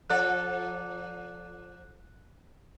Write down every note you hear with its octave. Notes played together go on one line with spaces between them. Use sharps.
F3 A4 D5 F#6